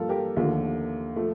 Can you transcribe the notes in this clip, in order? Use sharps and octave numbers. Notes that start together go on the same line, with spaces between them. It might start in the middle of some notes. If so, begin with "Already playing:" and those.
Already playing: G2 F3 A#3 F4 A4
G4 A#4
D#2 D3 F3 A3
F3 A3